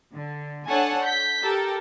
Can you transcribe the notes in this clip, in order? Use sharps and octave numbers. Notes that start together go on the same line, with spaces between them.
D3
D4 A4 C#5 F#5 G#5 A5
G6 B6
G4 A4 A#4